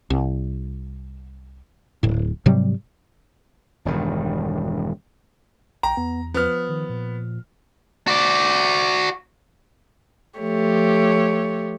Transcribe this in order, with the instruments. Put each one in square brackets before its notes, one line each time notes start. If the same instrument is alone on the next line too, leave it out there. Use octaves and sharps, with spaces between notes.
[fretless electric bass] C2
D1 A2
G#2 C3 F#3 G3
[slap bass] E1 G2 D#3
[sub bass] A#1 [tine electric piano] G5 [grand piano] A#5
[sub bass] E2 [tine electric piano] B3
[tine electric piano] F3 [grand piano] B3 F6
[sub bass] D#3
A#2
[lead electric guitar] F#4 D5
[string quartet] F3 A3 G4 C#5